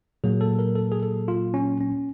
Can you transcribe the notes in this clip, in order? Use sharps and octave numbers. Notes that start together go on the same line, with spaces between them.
A#2 F#3 A#3 G#4
A4
A#4
A4
G#4
A4
F4
C#4
C#4